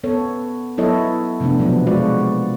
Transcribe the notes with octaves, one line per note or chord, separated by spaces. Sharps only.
B3 A4 C#5
F#3 B3 E4 A4 C#5 D#5
C3 F3 A3 B3 D4
B2 F3 F#3 A#3 B3
G#3 F4 F#4 D5